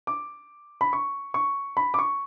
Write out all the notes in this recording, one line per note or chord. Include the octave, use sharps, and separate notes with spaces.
D6
B5
C#6
C#6
B5
D6
C#6